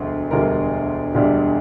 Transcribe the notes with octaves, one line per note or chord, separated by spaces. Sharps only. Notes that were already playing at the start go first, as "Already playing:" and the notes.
Already playing: E1 D2 D3 G3
E1 D2 D3 G3 A#4
E1 D2 D3 G3